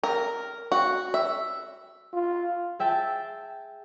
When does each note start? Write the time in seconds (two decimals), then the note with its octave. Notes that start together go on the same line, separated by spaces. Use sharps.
0.04 A#4
0.72 F#4
1.14 E5
2.13 F4
2.79 G#4 E5 G5 A5